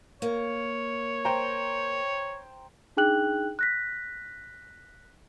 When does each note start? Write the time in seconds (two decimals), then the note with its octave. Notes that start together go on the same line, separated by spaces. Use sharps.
0.22 A#3 C#5
1.25 C5 G5 A#5
2.97 D4 D#4 G#4 G5 F#6 F#7
3.59 F#6 A#6 B6